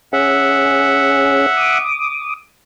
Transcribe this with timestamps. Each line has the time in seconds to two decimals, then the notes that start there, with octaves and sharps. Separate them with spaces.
0.13 C#4 G#4 E5 F#5
1.57 D6 D#6